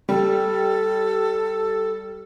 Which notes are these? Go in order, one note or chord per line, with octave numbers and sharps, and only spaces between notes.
G3 A4